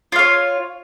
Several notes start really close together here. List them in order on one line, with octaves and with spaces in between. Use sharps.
F4 F5 C#5